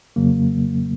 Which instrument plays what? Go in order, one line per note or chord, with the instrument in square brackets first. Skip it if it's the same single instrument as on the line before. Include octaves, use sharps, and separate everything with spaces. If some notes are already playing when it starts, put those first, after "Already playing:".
[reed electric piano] F2 C#3 F#3 A#3